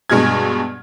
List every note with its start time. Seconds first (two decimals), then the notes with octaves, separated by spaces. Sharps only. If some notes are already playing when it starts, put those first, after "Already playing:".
0.10 G2 B2 G#3 F6 G#6